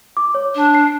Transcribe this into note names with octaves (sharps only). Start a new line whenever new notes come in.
D6
C#5
D4
C7